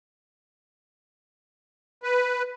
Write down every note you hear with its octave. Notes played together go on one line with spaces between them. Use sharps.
B4